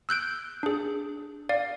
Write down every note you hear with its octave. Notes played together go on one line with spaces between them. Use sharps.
E6 F#6 G6 D7
D4 G#4
D5 F5